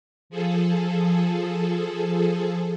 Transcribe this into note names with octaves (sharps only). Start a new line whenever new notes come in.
F3 G#4 A4